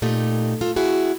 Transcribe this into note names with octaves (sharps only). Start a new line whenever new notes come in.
A#2 A3 D#4 G4
F4 A4
E4 F#4 G#4